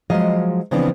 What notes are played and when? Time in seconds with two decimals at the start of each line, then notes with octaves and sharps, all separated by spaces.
0.10 F3 F#3 G#3 D#5 F5
0.71 C#3 E3 F3 B3 C4 D4